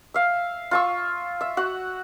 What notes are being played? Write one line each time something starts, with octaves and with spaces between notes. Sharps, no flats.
E5 F5
F4 C#6 E6
E5
F#4 F#5